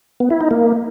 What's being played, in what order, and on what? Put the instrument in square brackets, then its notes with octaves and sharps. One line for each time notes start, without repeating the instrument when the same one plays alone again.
[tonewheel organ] B3
E4
D#4
A#3